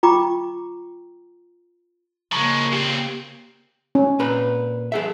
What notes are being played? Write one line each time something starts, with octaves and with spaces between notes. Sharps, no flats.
F4 G5 A#5 C#6 D6
C#3 F3 G#3 A#3 A#5 B5 C#6
A#2 C4 G4
C#4
A#2 B4 A#5
G#4 A4 E5